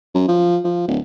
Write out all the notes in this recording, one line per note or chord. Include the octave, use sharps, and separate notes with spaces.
F#2
F3
F3
D1